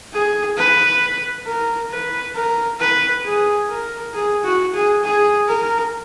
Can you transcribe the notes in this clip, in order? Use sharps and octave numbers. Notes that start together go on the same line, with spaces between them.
G#4
B4
A#4
B4
A#4
B4
G#4
A#4
G#4
F#4
G#4
G#4
A#4